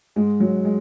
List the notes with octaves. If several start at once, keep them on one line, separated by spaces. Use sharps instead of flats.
G#2 G#3
F#3
G#3